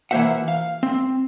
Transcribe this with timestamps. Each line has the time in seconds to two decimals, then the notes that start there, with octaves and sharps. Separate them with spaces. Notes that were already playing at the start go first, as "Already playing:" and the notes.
0.11 E3 A#3 C#4 C5 E5 F#5
0.48 F5
0.83 C4